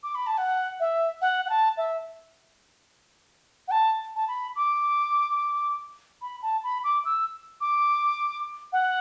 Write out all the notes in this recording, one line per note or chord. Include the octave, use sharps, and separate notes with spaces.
D6
B5
A5
F#5
E5
F#5
F#5
A5
E5
F#5
A5
A5
B5
D6
B5
A5
B5
D6
E6
D6
F#5